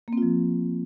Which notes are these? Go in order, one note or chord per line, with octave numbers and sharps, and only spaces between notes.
F3 A#3 C4 F4